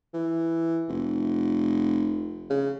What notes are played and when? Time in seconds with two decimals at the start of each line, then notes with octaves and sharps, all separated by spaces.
0.14 E3
0.89 F1
2.50 C#3